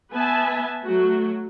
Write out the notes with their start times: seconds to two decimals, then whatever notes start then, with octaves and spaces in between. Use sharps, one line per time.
0.12 B3 B4 E5 G#5 A5
0.84 F#3 A3 F#4